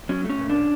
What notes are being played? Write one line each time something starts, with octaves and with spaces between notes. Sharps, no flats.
F#3 C#4
A3
C#4
A#2
C#4 D4